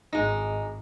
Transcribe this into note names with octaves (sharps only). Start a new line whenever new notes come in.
G#1 G#3 D#4 D#5